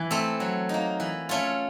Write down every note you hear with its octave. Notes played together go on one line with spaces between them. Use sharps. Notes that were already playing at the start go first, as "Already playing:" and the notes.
Already playing: E3
A3 C4
F#3
A#3 D#4
E3
A3 C#4 F4